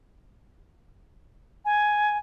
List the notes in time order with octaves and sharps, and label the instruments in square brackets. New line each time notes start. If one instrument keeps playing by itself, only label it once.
[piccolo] G#5